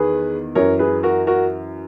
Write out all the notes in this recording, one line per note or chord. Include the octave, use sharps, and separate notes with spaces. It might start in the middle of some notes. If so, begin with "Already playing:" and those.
Already playing: E2 D#3 G#4 B4
F#2 E3 A#4 C#5
G#4 B4
F#4 A#4
F#4 A#4